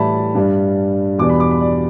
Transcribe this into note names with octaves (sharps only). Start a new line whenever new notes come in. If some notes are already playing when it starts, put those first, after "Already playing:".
Already playing: A2 E3 G3 D5 E5 A5 B5
G2 G3 D4
E2 B2 G3 D4 D6
B5
D6
B5
D5